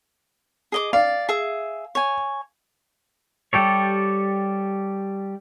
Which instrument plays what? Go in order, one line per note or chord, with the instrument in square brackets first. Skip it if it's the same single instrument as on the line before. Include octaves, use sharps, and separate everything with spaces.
[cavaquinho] G#4 D#5 D6
[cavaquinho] D5 [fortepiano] F5
[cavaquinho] G#4 E5
C#5 G#5
[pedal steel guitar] G3 G4 A4 C#5